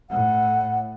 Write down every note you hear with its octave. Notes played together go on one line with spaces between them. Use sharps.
A2 F#5